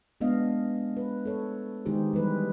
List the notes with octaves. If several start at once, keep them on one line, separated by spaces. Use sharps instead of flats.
G#3 B3 D4 D#5 F5
B4
A4 C#5
D#3 G#3 D#4 G4 G#4 C5
E3 G3 B4